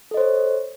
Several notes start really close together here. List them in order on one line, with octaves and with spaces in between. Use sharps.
A4 D#5 C5 C#5